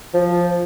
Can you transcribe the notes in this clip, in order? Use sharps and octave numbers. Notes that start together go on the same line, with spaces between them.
F3